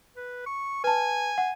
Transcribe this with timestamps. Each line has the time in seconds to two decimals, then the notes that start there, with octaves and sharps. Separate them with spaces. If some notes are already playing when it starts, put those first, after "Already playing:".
0.16 B4
0.46 C#6
0.84 B4 G#5 A5
1.38 F#5